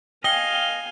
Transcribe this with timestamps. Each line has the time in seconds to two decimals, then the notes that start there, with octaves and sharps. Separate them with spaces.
0.24 D#5 F5 G5 G#5 G7